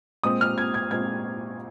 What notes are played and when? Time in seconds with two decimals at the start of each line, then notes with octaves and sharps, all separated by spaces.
0.23 A#2 G#3 C4 D#6
0.41 F6
0.58 G#6
0.74 G#6
0.91 A#2 G#3 C4 G#6